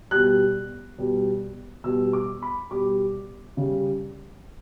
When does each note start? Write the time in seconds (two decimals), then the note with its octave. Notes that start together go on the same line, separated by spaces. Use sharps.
0.11 B2 G3 F#6
0.98 B2 G3
1.84 B2 G3 E6
2.13 D6
2.42 B5
2.71 B2 G3 D6
3.57 C#3 G3